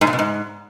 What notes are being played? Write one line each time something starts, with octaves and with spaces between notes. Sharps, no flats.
G#2
A#2
B2
G#2